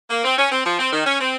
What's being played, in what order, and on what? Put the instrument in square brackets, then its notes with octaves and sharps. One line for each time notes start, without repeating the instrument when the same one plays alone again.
[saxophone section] A#3
C4
C#4
C4
F3
C4
D#3
C#4
C4